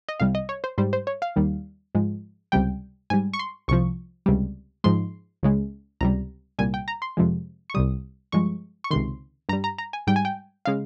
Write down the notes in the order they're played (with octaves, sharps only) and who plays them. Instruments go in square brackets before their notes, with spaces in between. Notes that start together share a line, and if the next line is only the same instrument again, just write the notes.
[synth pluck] D#5
C2 C3 G3 F5
D#5
C#5
C5
G#2 G3 C5
C5
C#5
F5
D#2 D#3 G3
G#2 F3 G#3
C#2 C3 G3 G5
G#2 G3 G#5
C#6
C6
C2 C3 F3 C#6
C#2 C3 G3
G#2 F3 G#3 C6
C#2 C#3 G#3
C#2 C3 G3 A#5
C2 A#2 G3 G#5
G5
A#5
C6
F2 C3 F3 G#3
C#6
C2 C3 G3 D#6
G2 F3 G#3 C#6
C#6
C#2 C3 D#3 C6
G2 A#5
G3
A#5
A#5
G#5
G#2 G3 G5
G#5
G5
C#3 G#3 F5